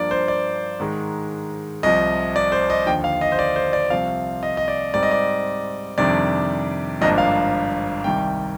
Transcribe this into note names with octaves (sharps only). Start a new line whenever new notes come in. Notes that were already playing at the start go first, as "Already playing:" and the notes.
Already playing: G2 F3 A#3 D4 D5
C5
D5
G#2 D#3 G#3
C2 C3 F3 D#5
D5
C5
D#5
D#2 D3 F3 G5
F5
D#5
C5
D5
C5
D5
C2 C3 F3 C4 F5
D#5
D#5
D5
G#2 G3 C4 D5
D#5
D5
F2 C3 D#3 G3 D4 D5
G#1 G2 F3 A#3 D4 D#5
F5
C2 C3 D#3 G3 G5